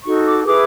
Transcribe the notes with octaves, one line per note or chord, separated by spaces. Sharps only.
D#4 F#4 A4 C#6
D6
E4 G#4 B4 D6